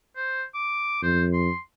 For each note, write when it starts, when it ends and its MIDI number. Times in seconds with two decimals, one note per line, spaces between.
0.16 0.42 72
0.54 1.00 86
1.03 1.49 41
1.03 1.23 72
1.33 1.58 84